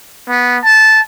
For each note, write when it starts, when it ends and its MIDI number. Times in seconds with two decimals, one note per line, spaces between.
0.30 0.58 59
0.65 1.00 81